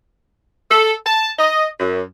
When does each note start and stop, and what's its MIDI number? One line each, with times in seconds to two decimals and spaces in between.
0.70 0.92 69
1.05 1.30 81
1.38 1.66 75
1.79 2.01 42